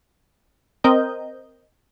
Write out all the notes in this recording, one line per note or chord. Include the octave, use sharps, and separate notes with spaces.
C4 A#4 D#5 G6